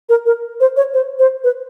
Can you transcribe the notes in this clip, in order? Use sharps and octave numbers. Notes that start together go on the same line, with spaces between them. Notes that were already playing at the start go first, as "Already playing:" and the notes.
A#4
A#4
C5
C#5
C5
C5
B4